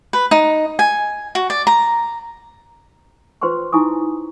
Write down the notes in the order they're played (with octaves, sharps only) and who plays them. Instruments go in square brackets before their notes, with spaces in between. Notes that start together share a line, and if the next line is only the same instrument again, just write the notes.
[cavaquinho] B4
D#4
G#5
F#4
D5
A#5
[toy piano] F4 B4 C5 G5 C6 C#6
D#4 E4 G#5 C#6 D#6